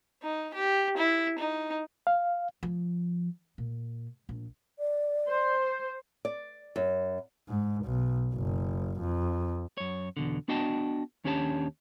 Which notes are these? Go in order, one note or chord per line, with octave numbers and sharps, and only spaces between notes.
D#4
G4
E4
D#4
F5
F3
A#2
A#1
D5
C5
D5
F#2
G#2
B1
F#1
F2
F#2 C#5
E2 B2 D3
B3 D4 F#4 D#5 G5 A5
D#2 C#4 D4 G4 C#5 A5